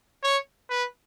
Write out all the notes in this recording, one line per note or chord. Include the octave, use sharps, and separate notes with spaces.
C#5
B4